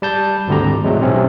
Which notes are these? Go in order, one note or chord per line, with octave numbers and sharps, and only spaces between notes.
G3 A5 G6
G#1 D2 D3 G3 G4 A#5
G#1
A2 C3 F#3 G#3
B1 C3 C4 C#4